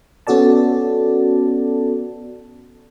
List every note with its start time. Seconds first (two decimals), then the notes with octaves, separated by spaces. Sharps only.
0.27 B3 C#4 F#4 A4 D5 A5